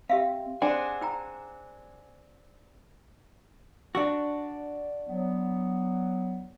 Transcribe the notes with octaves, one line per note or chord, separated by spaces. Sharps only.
C4 G4 E5 F5
C4 D4 G#4 F#5 G#5
D#4 G5 A#5
D4 F#4
F#3 B3